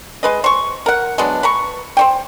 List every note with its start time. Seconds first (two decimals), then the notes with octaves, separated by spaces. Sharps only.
0.23 G#3 B4 D#5
0.44 C5 C#6
0.86 A#4 F#5
1.18 F#3 G#3 B3 D4
1.43 B4 A#5 C#6
1.97 C5 C#5 G5